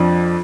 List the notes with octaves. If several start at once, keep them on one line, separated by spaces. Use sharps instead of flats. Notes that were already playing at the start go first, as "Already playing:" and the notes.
Already playing: F2 F3 D4